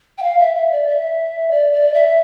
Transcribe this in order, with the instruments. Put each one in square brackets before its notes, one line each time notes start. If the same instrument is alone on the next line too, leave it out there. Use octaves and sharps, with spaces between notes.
[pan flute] G5
F5
E5
E5
D5
E5
D5
D5
E5